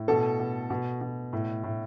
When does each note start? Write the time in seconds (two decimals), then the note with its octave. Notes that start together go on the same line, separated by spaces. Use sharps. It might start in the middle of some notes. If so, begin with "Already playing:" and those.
Already playing: A2
0.08 B2 A4
0.40 B2
0.70 B2
1.01 B2
1.33 A2
1.64 A2